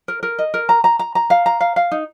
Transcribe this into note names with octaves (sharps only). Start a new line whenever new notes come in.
A#4
A#4
D#5
A#4
A#5
A#5
A#5
A#5
F5
A#5
F5
F5
D#4